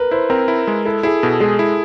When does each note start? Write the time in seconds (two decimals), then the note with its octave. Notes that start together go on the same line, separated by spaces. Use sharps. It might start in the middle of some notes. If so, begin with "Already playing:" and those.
Already playing: A#4 B4
0.11 E4 C5
0.30 C4 A#4
0.48 E4
0.67 G#3
0.85 E4 A4
1.03 E4 G#4
1.23 B2 A4
1.40 G#3 G#4
1.59 E4